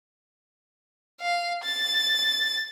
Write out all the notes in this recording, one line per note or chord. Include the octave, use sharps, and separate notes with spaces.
F5
A6